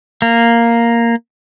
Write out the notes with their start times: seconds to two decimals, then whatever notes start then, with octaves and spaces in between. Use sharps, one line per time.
0.22 A#3